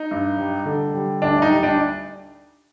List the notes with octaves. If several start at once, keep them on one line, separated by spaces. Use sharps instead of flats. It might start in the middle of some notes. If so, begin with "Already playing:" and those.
Already playing: D#4
G2
G3
D3
G3
D2 D4
D#4
G3
D4